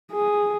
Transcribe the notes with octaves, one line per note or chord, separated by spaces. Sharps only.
G#4